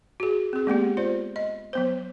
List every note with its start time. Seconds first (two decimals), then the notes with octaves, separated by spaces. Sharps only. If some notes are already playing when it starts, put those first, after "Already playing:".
0.20 F#4 G#4
0.53 C4 G#4
0.67 G#3 A#3 B3 G4
0.97 F4 C5 D5
1.36 D#5
1.73 F#3 B3 C5